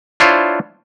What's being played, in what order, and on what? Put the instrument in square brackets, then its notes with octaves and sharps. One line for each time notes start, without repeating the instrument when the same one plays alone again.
[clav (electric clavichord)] D4 E4 F4 C5 C#5